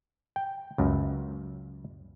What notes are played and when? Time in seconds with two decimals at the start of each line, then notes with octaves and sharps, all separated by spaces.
0.36 G5
0.78 C#2 F#2